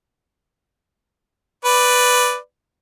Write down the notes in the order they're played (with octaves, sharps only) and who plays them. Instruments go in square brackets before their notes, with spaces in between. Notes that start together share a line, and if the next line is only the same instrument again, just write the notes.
[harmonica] B4 D5